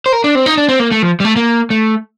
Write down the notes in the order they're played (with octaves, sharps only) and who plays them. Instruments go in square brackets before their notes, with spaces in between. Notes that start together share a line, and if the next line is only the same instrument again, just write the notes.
[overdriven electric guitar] C5
A#4
D4
C4
D#4
D4
C4
A#3
A3
F3
G3
A3
A#3
A3